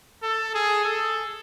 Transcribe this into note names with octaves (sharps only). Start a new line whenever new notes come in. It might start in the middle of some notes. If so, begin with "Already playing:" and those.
A4
G#4
A4